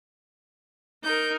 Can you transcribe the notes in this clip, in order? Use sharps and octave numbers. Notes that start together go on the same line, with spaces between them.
D#4 A#4 G6